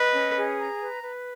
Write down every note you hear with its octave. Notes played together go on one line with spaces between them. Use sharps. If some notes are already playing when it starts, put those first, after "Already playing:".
Already playing: B4 D#5
C#4
G#4
A#5
B4
B4